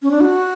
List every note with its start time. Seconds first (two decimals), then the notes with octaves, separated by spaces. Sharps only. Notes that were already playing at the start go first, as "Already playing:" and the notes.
0.02 C#4
0.11 D4
0.21 F#4